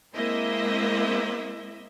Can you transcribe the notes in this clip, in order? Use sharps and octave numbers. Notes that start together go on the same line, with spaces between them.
G#3 A#3 C4 E4 D#5 E5